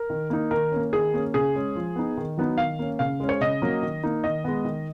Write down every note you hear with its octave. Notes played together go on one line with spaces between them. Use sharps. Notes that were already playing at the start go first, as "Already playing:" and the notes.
Already playing: A#4
D#3
A#3 D#4
D#3 A#4
A#3 C#4
D#3 G#4
A#3 C#4
C#3 G#4
G#3 C#4
F3
B3 D#4
D#3
F#3 B3 D#4
D#3 F5
A#3 C#4
C#3 F5
G#3 C#4
C#5
C#3 D#5
F#3 A#3 C#4
D#3
A#3 D#4
D#3 D#5
G#3 B3
D#3